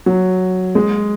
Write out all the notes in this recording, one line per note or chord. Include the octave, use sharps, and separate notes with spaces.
F#3
G#3